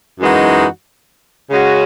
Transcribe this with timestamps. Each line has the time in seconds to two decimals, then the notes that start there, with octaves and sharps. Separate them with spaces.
0.20 F#2 E3 G#3 D#4 F#4
1.51 C#3 G#3 C#4 F#4